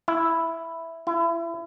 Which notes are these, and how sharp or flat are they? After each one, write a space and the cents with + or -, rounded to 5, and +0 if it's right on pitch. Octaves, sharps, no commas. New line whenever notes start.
E4 +0
E4 +30